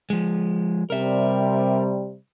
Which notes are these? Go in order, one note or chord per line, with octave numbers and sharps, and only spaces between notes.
F3 G#3
C3 G3 A#4 E5